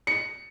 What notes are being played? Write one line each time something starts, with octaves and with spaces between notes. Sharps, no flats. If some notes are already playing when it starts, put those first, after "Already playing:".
C#7